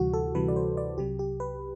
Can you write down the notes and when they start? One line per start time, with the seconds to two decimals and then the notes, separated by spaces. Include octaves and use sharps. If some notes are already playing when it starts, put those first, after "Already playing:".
Already playing: D2 C3 E3 G3 F#4
0.13 A4
0.35 D2 C3 E3 G3 B4
0.48 D5
0.56 C5
0.77 D5
0.97 C2 C3 F#3 G4
1.19 G4
1.40 B4